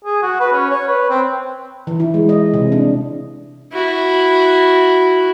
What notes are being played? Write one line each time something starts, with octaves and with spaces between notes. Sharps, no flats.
G#4
F#4
B4
C#4
C#5
B4
C4
E3
E4
G#3
D#5
C3
D4
E4 F#4